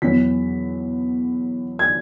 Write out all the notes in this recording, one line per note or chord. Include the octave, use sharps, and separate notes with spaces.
E2 B2 F#3 B3 B6
G#6